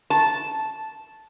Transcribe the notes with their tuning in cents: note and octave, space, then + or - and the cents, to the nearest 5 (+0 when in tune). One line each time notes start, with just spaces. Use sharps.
A5 -10